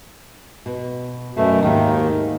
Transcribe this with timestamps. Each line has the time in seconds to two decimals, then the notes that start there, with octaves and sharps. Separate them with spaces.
0.66 B2
1.37 F#2 B2 A3
1.62 D#2 G#2 D#3 D#4